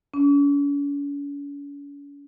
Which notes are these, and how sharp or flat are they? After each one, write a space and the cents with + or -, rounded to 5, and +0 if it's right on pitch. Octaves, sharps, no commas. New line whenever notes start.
C#4 +45